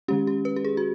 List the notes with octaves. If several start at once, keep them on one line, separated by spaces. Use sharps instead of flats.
D#3 G#3 C#4 G4
G4
B4
G4
G#4
F#4